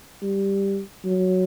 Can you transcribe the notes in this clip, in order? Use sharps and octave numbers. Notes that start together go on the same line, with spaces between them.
G3
F#3